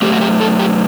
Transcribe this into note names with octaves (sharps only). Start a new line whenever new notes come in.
F#2 E3 A3 G4
F#4
G4
A4
G4